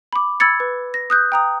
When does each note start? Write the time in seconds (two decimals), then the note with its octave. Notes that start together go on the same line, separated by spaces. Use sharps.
0.13 B5 D6
0.40 B5 E6 G#6 A6 C#7
0.60 B4
0.94 A#6
1.10 D#6 F#6 G6
1.32 G5 A#5 D#6